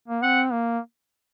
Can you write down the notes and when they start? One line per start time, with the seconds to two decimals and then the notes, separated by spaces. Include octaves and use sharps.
0.08 A#3
0.23 C4 F#5
0.52 A#3